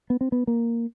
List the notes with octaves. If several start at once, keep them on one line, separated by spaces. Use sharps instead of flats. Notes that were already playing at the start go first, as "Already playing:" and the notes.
B3
C4
B3
A#3